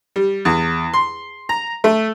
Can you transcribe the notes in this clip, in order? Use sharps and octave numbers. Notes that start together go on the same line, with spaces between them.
G3
E2
C6
A#5
A3